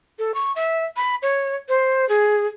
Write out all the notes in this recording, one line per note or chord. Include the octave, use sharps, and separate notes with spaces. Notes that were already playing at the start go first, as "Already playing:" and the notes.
A4
C#6
E5
B5
C#5
C5
G#4